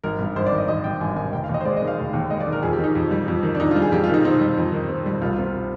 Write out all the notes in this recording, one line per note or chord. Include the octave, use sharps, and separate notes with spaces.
G#1 A#4
G2
G#1 C5
D5
D#3
D#5
G#1 D#5
G2 G5
G#1 G#5
D#3 G#5
F1 G5
F5
D#2
D#5
C5
G#3 D5
D#5
D#3
F5
F1
D#2
G#3 D#5
D5
D#3
A#4
F2 G#4
G4
D#3
D#4
F2
G3
F2
D#3
D4
F2 D#4
F4
G3
G#4
F2 G4
F4
D#3 D#4
C4 D#4
G3
F2
D#3
C4
G3
C2 F4
F4
C3
F4